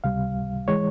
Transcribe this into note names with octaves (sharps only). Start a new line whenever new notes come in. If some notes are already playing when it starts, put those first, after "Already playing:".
C#2 C3 G3 F5
E3 G#3 C#5